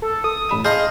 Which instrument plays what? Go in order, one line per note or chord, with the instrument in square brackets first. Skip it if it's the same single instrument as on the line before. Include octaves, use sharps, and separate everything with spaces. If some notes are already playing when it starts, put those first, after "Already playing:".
[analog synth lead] A4
D#6
[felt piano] A1 B5 E7
[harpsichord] G#4 D#5 [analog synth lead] F5 [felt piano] A5 C6 G6